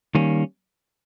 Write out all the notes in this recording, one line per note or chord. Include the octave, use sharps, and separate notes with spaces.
D#3 G3 A#3 C#4